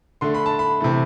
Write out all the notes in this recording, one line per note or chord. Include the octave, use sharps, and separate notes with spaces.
D3 A3 C6
B5
A5
B5
C3 E3 A3